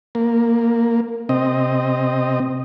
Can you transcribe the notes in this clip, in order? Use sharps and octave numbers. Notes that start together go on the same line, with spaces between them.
A#3
C3 C4 D#5